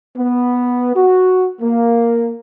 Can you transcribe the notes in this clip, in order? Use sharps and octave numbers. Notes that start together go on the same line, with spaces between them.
B3
F#4
A#3